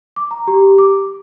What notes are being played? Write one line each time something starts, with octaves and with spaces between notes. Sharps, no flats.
D6
A#5
G4
D6